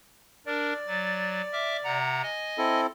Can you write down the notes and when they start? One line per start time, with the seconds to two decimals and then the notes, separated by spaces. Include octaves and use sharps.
0.46 D4 A#4 D5
0.87 F#3 A6
1.53 E5 D6 F6
1.84 C3 F#5 A#5
2.23 D#5 G#5
2.58 C4 E4 A4